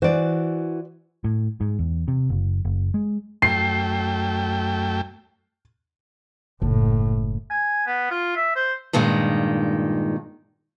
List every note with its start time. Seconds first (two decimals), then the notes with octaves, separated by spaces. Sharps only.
0.02 E3 F#4 C5 D5
1.24 A2
1.61 G#2
1.79 E2
2.08 C3
2.30 F#1
2.65 F#1
2.94 G#3
3.42 F#2 A3 G5 C7
6.62 F#1 A2
7.51 G#5
7.86 B3
8.11 F4
8.36 E5
8.56 C5
8.93 G2 A#2 D#3 G#3